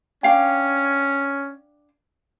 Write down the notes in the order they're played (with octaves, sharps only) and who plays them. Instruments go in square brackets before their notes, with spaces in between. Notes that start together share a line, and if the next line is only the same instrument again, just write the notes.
[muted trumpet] C#4 [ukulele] D4 F5 G5